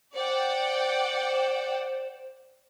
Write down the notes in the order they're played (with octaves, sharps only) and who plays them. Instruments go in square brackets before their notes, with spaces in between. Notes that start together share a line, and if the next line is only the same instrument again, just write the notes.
[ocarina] C5 [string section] D5 F#5 G5